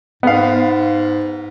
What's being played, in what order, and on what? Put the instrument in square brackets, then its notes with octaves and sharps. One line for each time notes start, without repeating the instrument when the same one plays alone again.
[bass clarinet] G#2 [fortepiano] B3 F5